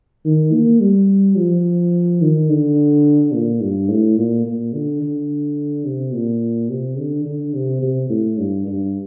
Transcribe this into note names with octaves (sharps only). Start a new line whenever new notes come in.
D#3
A#3
G3
F3
D#3
D3
A#2
G2
A2
A#2
A#2
D3
D3
C3
A#2
C3
D3
D3
C3
C3
A2
G2
G2